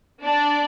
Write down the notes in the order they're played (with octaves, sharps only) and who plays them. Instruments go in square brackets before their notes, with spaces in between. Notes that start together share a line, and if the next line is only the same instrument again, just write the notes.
[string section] D4 D5